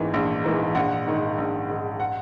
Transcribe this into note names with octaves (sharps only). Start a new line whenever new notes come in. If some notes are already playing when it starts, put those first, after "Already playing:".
Already playing: A#1 G#2 E3 A#3
A#1
G#2 E3 A#3
A#1 F#5
G#2 D#3
A#1
G#2 D#3
F#5